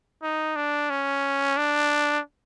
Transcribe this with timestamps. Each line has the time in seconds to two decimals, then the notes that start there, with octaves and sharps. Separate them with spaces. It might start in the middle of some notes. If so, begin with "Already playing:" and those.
0.23 D#4
0.56 D4
0.90 C#4
1.57 D4